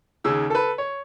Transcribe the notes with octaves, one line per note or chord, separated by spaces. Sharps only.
D#2 C#3 E6
A4 B4
C#5